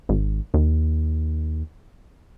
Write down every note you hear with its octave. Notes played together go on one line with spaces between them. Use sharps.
G#1
D#2